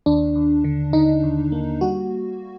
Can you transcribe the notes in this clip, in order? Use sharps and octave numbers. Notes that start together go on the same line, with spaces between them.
D#2 D4
D#2
D3
D3 D#4
D#2
A#3
G3 F#4